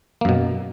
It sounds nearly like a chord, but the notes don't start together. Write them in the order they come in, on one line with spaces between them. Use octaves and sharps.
A#3 F#2 B2